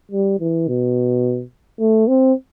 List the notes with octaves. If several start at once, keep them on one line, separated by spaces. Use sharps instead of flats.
G3
E3
B2
A3
C4